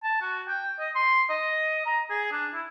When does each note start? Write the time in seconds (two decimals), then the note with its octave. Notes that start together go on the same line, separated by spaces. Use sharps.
0.03 A5
0.22 F#4
0.48 G5
0.80 D#5
0.95 C6
1.30 D#5
1.86 A#5
2.10 G#4
2.32 D4
2.54 E4